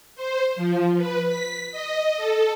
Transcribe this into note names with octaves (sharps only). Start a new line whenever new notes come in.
C5
F3
B4
B6
D#5
A4